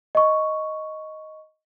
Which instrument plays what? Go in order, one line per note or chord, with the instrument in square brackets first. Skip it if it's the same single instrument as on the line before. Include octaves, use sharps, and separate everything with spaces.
[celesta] D#5 C#6